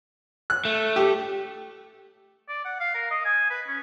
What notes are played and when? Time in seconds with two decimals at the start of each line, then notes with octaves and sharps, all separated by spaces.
0.50 F#6
0.65 A3
0.96 G4
2.49 D5
2.65 F#5
2.80 F5
2.94 A#4
3.11 D#5
3.25 G#5
3.50 B4
3.67 C#4